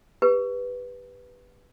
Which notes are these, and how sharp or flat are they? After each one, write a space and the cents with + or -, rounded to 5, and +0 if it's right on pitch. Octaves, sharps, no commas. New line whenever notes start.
G4 +20 B4 +0